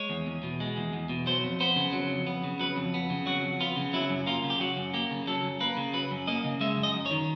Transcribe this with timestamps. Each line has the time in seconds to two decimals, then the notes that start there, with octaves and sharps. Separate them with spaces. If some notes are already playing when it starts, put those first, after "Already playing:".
Already playing: G#3 C#5
0.10 E2
0.27 E2
0.43 B2
0.60 G#3
0.77 E2
0.93 E2
1.09 B2
1.26 F#3 C5
1.44 F2
1.60 B3 C5
1.76 C#3
1.93 F#3
2.10 F2
2.27 B3
2.44 C#3
2.60 F#3 B4
2.77 F2
2.94 B3
3.10 C#3
3.26 F#3 F#4
3.43 F2
3.60 B3 F4
3.77 C#3
3.93 F#3 E4
4.10 F#2
4.26 A#3 F4
4.44 C#3
4.50 G4
4.61 F#3 F#4
4.77 F#2
4.94 A#3 G4
5.11 C#3
5.27 F#3 A4
5.43 F#2
5.60 A#3 B4
5.77 C#3
5.93 F#3 B4
6.11 F#2
6.27 A#3 D#5
6.44 C#3
6.61 G#3 E5
6.77 F#2
6.83 D#5
6.94 F#2
7.06 C#5
7.11 D#3